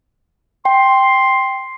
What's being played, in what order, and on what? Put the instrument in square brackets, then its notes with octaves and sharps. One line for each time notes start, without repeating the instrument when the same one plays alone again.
[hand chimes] G5 [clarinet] C6